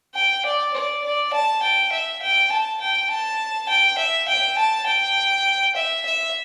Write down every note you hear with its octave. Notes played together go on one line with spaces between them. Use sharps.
G5
D5
D5
D5
A5
G5
E5
G5
A5
G5
A5
G5
E5
G5
A5
G5
E5
E5